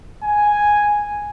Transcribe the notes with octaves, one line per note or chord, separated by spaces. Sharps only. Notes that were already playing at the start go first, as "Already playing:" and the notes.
G#5